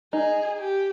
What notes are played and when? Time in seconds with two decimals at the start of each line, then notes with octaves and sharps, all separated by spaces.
0.13 D#4 G#4
0.60 G4